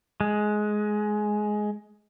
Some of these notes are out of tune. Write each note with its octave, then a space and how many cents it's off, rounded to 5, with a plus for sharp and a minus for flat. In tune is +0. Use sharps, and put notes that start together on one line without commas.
G#3 +15